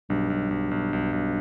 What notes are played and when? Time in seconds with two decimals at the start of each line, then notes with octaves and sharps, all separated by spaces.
0.10 B1 G2
0.30 B1
0.51 B1
0.71 B1
0.93 B1
1.13 B1